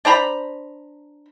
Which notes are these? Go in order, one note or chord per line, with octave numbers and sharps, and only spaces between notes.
D4 C5 A#5 B5